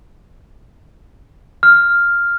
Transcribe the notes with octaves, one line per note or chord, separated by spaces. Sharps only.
F6